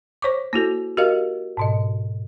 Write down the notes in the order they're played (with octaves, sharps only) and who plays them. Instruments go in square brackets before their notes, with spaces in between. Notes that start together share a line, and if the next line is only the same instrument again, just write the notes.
[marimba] C5 C#5 C#6 D6
A#3 E4 F#4 A4
F#4 G4 A#4 D#5 F5
G#2 B2 D#5